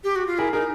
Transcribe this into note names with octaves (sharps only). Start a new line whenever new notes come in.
G4
F#4
F4
E4 G#4 A#4
D#4 G#4 A#4